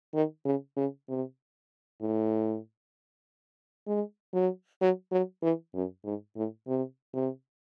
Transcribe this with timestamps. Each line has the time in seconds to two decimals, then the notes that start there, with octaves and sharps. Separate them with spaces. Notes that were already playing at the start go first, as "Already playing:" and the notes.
0.14 D#3
0.45 C#3
0.76 C#3
1.08 C3
2.01 A2
3.87 G#3
4.33 F#3
4.81 F#3
5.12 F#3
5.42 E3
5.74 F#2
6.05 G#2
6.36 A2
6.68 C3
7.14 C3